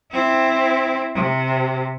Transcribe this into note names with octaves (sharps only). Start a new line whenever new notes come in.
C4 E4
C3